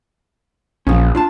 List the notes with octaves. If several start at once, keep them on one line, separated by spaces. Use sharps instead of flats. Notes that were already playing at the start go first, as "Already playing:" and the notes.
A#1 F3 C#4
D4 F4 A5